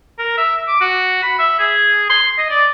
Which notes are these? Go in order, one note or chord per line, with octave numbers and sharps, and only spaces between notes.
A#4
E5
D6
F#4
B5
E5
G#4
C6
D#5
D5